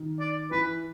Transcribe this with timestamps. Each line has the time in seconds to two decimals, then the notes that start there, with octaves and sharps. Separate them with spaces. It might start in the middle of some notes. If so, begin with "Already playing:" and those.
Already playing: D#3
0.20 D5
0.51 E3 B4